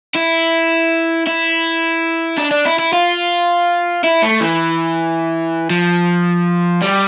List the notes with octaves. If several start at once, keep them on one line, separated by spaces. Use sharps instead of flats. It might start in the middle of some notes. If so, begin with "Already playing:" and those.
E4
E4
D4
D4
E4
E4
F4
E4
A3
E3
F3
G3